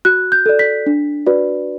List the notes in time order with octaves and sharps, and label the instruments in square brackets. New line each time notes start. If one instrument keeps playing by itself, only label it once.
[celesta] F#4 F#6
G6
A4 D5
B6
D4
F#4 B4 D5